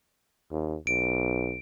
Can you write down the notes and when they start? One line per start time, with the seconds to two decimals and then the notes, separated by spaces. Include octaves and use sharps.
0.52 D#2
0.87 B1 D7